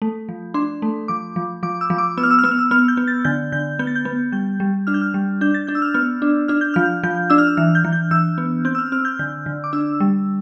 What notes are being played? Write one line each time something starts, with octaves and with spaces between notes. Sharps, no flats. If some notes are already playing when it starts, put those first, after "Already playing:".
A3
F3
D4 C6
A3
F3 D6
F3
F3 D6
E6
F3
D6
B3 E6
F6
E6
F6
B3 E6
F6
E6
B3 F6
G6
B3
A6
D3 G6
D3 G6
B3 G6
A6
G6
B3
G3 G6
G3
D4 F6
G6
F6
G3
D4 G6
A6
D4 G6
E6
F6
B3 F6
D4
D4 F6
G6
F3 F6
F3 G6
D4 E6
F6
E6
E3 F6
G6
E3
G6
E3 E6
B3
C4 G6
E6
F6
C4 F6
G6
D3 G6
D3
D6
D4 E6
G3